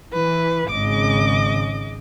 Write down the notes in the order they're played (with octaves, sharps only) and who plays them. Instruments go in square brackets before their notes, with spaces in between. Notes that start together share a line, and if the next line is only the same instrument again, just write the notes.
[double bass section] E3 [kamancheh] B4
[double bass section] G#1 G#2 C#3 [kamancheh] D#5 D6